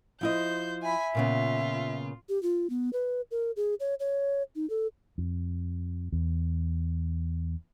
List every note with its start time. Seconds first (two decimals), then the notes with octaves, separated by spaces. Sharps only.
0.21 F3 E4 C5 D#5 G6
0.83 E5 G#5 B5
1.15 A#2 C#3 B3 F4
2.29 G4
2.43 F4
2.70 B3
2.93 B4
3.31 A#4
3.56 G#4
3.80 C#5
4.00 C#5
4.56 D#4
4.70 A4
5.18 F2
6.12 E2